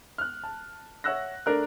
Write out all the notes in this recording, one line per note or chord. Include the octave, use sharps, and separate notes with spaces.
F6 F#6
A5
C#5 E5 F#5 E6 F#6 A#6
A3 D4 A#4 F#6